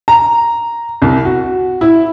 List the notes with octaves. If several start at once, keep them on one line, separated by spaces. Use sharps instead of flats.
A#5
C2
F#4
E4